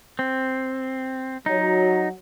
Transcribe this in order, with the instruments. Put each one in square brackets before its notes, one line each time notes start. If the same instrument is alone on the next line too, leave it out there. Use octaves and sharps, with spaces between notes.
[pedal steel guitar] C4
[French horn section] F#3 [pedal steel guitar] D#4